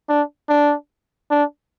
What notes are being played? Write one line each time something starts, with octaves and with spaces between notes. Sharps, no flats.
D4
D4
D4